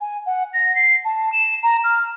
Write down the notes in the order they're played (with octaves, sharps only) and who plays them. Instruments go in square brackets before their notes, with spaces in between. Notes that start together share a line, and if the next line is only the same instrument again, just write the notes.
[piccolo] G#5
F#5
A#6
C7
A5
E7
A#5
F6